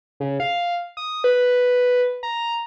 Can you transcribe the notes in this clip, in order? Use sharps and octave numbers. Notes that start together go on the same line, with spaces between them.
C#3
F5
D#6
B4
A#5